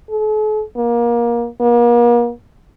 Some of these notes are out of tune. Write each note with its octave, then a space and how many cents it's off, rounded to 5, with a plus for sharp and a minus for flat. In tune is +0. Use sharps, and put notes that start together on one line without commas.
A4 -45
A#3 +25
A#3 +40